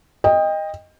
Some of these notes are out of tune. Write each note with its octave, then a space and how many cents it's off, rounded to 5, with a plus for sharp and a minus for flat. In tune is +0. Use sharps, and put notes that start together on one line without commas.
D#5 +0 G5 +25